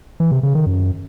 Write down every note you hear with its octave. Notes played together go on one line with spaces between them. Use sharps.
E3
C3
C#3
D#3
F#2